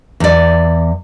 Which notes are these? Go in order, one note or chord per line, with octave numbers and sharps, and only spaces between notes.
E2 D5